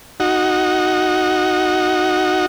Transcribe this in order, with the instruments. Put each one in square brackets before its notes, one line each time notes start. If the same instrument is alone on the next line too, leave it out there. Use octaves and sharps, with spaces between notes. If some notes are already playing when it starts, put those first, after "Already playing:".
[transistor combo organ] D#4 F#4